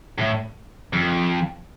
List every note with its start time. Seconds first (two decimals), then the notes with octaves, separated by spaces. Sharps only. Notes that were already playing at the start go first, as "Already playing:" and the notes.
0.18 A2
0.93 F2